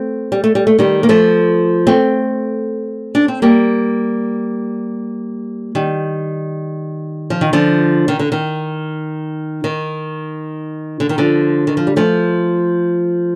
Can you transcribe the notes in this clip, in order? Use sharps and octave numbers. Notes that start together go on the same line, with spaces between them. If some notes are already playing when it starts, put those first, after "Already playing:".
Already playing: A3 C4
G3
A3
G3
A3
D#3 G3
A#3
F3 A3
A3 C4
D4
C4
G3 A#3
D#3 G3
F3
D#3
D3 F3
D#3
D3
D#3
D#3
D3
D#3
D3 F3
D#3
F3
G3
F3 A3